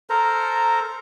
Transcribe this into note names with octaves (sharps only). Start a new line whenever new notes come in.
A4 A#4 C5 A#5